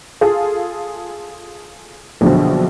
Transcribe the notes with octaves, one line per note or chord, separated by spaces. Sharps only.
F4 G#4 A4
A#1 F#2 B2 D3 F3